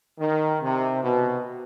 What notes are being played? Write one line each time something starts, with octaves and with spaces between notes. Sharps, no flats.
D#3
C3
B2